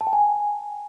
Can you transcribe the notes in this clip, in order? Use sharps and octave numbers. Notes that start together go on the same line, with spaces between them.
A5
G5
G#5